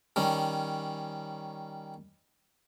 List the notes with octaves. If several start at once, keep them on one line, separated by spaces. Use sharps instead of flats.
D#3 G3 C#4